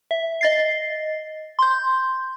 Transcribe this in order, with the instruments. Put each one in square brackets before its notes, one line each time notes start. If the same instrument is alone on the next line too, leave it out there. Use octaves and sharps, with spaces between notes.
[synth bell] E5
D#5 A6 C7
C6 G6